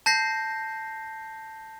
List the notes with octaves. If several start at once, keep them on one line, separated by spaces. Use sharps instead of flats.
A5 G6 A#6 C7